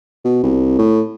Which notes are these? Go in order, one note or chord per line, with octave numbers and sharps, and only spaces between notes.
B2
C2
A2